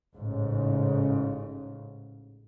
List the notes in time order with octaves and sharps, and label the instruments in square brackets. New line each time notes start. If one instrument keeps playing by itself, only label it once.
[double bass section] A1 G#2 C#3